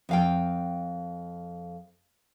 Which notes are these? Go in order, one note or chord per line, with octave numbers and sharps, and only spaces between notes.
F2 F5 G5